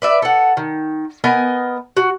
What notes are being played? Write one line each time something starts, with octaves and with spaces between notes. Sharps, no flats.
B4 D5 E5
A4 F#5
D#3
B3 A#4 D#5 G#5
F#4